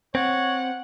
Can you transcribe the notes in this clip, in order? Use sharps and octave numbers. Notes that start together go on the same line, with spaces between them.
C4 C#5 F#5